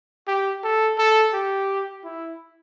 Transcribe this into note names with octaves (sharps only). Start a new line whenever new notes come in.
G4
A4
A4
G4
E4